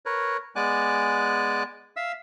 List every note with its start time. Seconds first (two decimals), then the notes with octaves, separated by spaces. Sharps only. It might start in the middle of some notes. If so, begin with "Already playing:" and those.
0.06 A#4 B4 C#5
0.56 G#3 B3 D5 G#5 D6 F#6
1.96 E5 F5 E6